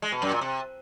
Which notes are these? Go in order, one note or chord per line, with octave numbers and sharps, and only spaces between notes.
G#3
B2
F#2
A#2
C3